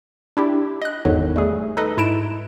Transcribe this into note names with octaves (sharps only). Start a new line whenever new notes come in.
D4 E4 G4
D#5 F#6
G1 E2 G#2 D3 D#3 F#3
G3 A3 G#4
D#4 A4 B4 D#5
G#2 E4 A5 D7 E7